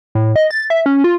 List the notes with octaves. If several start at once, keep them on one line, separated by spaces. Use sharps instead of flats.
A2
D#5
A6
E5
C#4
F4